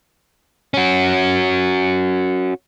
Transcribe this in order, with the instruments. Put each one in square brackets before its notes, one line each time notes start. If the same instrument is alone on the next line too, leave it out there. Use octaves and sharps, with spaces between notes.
[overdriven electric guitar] C#4 F#4